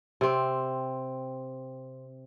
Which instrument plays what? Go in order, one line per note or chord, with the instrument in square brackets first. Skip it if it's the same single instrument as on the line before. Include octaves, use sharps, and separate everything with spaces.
[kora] C3 C4